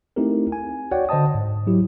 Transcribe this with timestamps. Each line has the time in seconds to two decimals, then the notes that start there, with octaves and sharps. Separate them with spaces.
0.16 A3 C4 D#4 E4 G4 A#4
0.52 G#5
0.91 F#4 C#5 D5 F#5 G5
1.09 D3 C5 D#5 A5 D#6
1.35 G#2
1.67 F#3 E4 G4